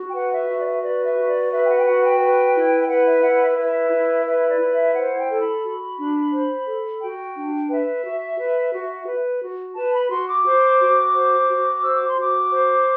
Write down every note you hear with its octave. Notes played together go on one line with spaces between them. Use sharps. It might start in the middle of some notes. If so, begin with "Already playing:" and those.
Already playing: F#4
G5
B4 F#5
E5
F#4 E5
D5
E5
B4 D5
E5
F#4
D5
B4 E5
G5
F#5
G5
F#4 F#5
G5
B4
E4
G5
B4 F#5
E5
E4 F#5
E5
B4 E5
E4
B4 E5
D5
E4
E5
C5 F#5
G5
A4
B5
F#4
D4
C5
A4
F#4 G5
D4
B4 E5
F#4
B4
F#4
B4
F#4
B4 A5
B5
F#4 C6
D6
C5
F#4
C5
F#4
C5 E6
D6
C6
F#4 D6
C5